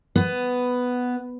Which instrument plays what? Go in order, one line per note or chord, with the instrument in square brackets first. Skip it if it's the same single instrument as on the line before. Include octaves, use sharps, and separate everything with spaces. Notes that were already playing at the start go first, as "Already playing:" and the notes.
[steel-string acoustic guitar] B3